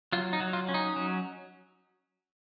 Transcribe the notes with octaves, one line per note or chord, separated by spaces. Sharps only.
F#3 F4
D#4
F#3
F4
C#4
D#4
F#3